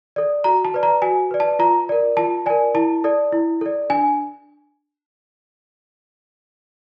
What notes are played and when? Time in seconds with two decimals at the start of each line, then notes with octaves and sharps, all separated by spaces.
0.16 A4 D5
0.44 F#4 A#5
0.65 A5
0.74 B4 D5
0.83 A#5
1.02 F#4 G#5
1.31 B4 D5
1.40 A5
1.59 F4 A#5
1.89 A#4 D5
2.17 F4 A5
2.46 A#4 D5 G#5
2.75 E4 A5
3.04 A4 D5
3.32 E4
3.61 A4 D5
3.90 D4 G#5